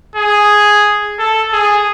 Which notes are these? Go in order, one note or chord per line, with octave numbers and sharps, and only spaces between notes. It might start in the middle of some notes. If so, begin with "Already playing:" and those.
G#4
A4
G#4